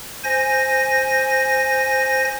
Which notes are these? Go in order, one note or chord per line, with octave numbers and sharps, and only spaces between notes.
C5 G#5 A#6